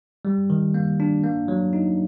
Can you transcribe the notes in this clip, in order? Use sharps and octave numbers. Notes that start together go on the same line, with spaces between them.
G3
D#3
A#3
D4
A#3
F#3
D#4